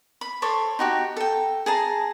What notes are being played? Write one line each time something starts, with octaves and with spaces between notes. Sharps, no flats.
B5
A4 C5 C#5 D6
D#4 F#4 G4
A4 G5
G#4 A5 A#5